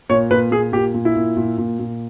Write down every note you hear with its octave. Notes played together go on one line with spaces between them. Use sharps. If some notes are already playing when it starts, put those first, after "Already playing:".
A#2 C#5
A#2 B4
A#2 G#4
A#2 G4
A#2
E4
A#2
A#2
A#2
A#2